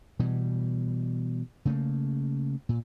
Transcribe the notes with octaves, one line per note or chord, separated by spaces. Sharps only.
B2 E3 G3
C#3 A3 A#3
A#2